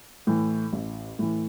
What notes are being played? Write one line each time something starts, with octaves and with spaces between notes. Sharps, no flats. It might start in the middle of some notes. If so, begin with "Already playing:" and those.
A2 E3
A1
A2 E3